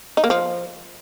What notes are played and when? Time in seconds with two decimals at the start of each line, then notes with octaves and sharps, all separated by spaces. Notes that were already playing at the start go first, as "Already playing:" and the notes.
0.17 D#4
0.24 A#3
0.30 F3